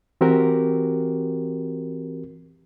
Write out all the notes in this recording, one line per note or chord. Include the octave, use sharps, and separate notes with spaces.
E3 C4 F#4 G4 A#4